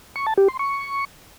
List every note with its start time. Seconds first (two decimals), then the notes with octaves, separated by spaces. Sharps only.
0.16 C#6
0.27 A5
0.37 G4
0.48 C6
0.59 C#6